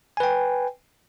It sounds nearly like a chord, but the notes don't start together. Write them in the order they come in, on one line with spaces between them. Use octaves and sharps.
G#5 B4 G5